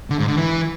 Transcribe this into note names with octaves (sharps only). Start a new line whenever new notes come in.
D3
G#2
D3
E3